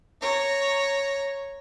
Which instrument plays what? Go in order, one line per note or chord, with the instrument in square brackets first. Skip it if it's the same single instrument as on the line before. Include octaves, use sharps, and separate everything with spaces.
[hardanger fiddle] C#5 A#5